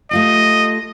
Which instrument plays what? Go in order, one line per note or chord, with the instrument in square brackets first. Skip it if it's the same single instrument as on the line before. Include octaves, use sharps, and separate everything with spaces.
[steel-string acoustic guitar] A3 F4 G4 [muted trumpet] D#5